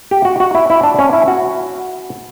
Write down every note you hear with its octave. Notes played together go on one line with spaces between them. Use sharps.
G4
F#4
F#4
E4
E4
D4
C#4
E4
F#4